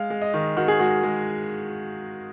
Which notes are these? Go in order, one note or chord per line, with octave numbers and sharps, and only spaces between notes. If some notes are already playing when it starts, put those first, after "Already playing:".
Already playing: G#3 F5
G#3
D#5
D#3
D#3 F#4
G#4
G#3 F#4
G#3